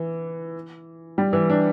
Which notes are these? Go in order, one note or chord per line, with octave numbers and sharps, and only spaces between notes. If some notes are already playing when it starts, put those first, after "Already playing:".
Already playing: E3
G3
E3
D4